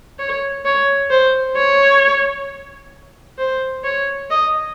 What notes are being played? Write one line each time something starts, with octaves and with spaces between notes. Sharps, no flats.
C#5
C#5
C5
C#5
C5
C#5
D#5